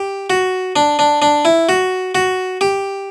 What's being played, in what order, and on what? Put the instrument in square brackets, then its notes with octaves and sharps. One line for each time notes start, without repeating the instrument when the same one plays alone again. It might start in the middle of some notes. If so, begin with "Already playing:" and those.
Already playing: [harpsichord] G4
F#4
D4
D4
D4
E4
F#4
F#4
G4